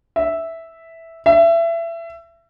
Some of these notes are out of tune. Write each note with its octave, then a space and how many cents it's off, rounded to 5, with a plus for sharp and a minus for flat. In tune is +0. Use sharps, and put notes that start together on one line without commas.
E5 -5
E5 +25